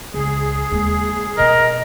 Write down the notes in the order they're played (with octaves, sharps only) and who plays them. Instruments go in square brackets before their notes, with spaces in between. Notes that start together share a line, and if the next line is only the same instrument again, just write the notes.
[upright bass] C#2 [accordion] G#4
[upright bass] D#2 G#3
[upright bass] B2 B3 [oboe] A#4 [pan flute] D#5